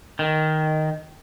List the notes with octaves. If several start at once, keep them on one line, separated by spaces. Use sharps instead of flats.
D#3